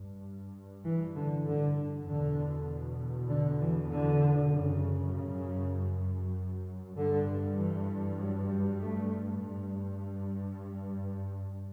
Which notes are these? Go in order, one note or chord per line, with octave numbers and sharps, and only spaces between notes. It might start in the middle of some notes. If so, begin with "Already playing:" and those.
Already playing: G2
E3
D3
D3
E2 B2 D3
D3
E3
D3
F#2 C#3
C#3
G2 D3
E3
F#3
G3
A3
G2